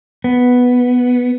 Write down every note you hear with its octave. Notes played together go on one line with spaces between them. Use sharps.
B3